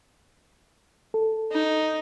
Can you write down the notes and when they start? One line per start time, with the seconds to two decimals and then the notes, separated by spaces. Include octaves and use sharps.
1.14 A4
1.52 D#4